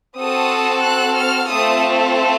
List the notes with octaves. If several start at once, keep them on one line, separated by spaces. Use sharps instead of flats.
C4 F#4 A4 D#6
F#6
F6
A3 C4 F4 A4 D#6